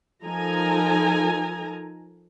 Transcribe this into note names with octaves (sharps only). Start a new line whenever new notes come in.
F3 D#4 A4 A#4 G#5 A#5